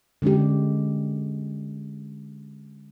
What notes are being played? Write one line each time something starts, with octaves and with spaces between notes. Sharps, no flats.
D3 G#3 C#4 D4 G4